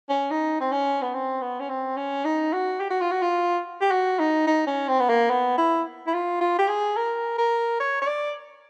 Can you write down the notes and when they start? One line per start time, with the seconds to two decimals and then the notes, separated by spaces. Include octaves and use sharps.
0.09 C#4
0.30 D#4
0.61 C4
0.72 C#4
1.02 B3
1.14 C4
1.41 B3
1.60 C#4
1.69 C4
1.97 C#4
2.25 D#4
2.53 F#4
2.80 G4
2.90 F#4
3.01 F4
3.11 F#4
3.22 F4
3.82 G4
3.91 F#4
4.19 D#4
4.47 D#4
4.67 C#4
4.88 C4
5.00 B3
5.09 A#3
5.30 B3
5.58 E4
6.07 E4
6.14 F4
6.41 F4
6.58 G4
6.68 G#4
6.97 A#4
7.38 A#4
7.80 C#5
8.02 C#5
8.07 D5